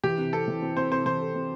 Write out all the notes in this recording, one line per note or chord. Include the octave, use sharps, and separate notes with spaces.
E3 G4
C3
C4 A4
E3
C4
C4 C5
C3 C5
E3 C5
A4
C4